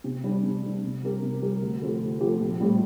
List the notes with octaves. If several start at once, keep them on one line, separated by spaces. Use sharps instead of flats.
C3
G3 D4
C3
G3 D4
C3
G3 C4 G4 A#4
C3
G3 C4 G4 A#4
D2
D3 F3 C4 G4
D2
D3 F3 C4 G4
A#1
A2 G3 C4 G4